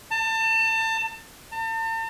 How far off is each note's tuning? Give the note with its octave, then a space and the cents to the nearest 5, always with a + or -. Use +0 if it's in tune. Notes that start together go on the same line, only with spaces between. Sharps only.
A5 +30
A5 +40